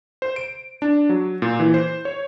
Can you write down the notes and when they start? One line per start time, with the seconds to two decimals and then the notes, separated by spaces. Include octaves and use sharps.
0.22 C5
0.36 D7
0.82 D4
1.09 F#3
1.42 A#2
1.60 E3
1.74 C5
2.05 C#5